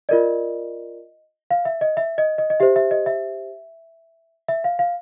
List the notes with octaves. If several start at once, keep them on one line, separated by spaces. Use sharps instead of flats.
F4 A#4 D5 D#5
F5
E5
D#5
E5
D#5
D#5
D#5
G4 C5 E5
E5
D#5
E5
E5
F5
F5